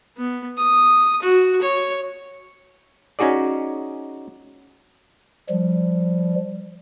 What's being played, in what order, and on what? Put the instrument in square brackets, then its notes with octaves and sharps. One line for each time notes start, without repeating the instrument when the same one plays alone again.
[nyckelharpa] B3
D#6
F#4
C#5
[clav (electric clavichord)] C#4 D#4 F#4 G#4 D5
[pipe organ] F3 G3